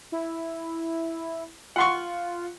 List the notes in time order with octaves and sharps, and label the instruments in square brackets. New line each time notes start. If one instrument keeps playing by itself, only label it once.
[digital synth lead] E4
[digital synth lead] F4 [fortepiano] F#5 C6 C#6